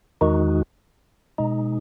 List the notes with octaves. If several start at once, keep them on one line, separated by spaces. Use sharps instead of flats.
E2 D#3 G#3 D#4 F#4
B2 G#3 D#4